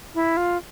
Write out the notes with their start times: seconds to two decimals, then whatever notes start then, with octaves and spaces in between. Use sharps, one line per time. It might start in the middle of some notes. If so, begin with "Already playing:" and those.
0.15 E4
0.37 F4